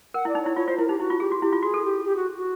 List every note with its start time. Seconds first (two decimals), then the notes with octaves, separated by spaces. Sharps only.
0.14 A#4 F#5
0.25 E4 D5
0.35 D#4
0.42 E4 C#5
0.56 F4 C#5
0.67 F4 C5
0.79 E4 A#4
0.88 D#4 G4
1.00 E4 F#4
1.10 F4
1.20 G4 G#4
1.32 F#4
1.42 E4 G4
1.53 F4
1.63 F#4 G#4
1.74 A4
1.85 G4
2.05 G4
2.16 F#4
2.38 F#4